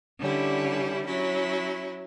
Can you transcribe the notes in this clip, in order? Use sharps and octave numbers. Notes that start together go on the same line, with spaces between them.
D3 G3 C#4 E4
F#3 C#4 E4